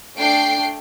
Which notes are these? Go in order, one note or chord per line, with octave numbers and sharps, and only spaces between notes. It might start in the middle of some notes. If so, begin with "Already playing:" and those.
A3 D4 G5 C7 D7